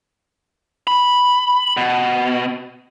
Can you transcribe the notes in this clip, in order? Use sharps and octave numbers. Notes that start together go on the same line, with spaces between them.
B5
B2